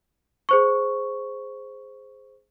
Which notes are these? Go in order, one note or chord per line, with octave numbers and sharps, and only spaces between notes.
G#4 C5 C#6